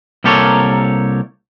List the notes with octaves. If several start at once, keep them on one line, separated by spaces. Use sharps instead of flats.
C2 A#3 G4 A4 A#4 C#5